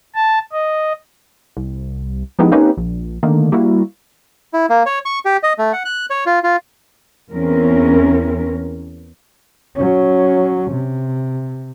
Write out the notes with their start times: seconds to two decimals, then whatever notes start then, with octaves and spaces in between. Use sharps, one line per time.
0.15 A5
0.52 D#5
1.57 C2
2.39 F3 G#3 B3 D#4 E4 G4
2.52 A#3 C4 C#4 D#4 G4 B4
2.77 A#1
3.23 D3 D#3 A3 A#3
3.52 G3 A#3 E4 F#4
4.54 E4
4.70 A#3
4.86 C#5
5.05 C#6
5.25 G4
5.43 D#5
5.58 A3
5.73 F#5
5.85 F#6
6.10 C#5
6.26 F4
6.44 F4
7.31 E2 C4 C#4 A#4
9.75 F#3 C#4
10.71 C3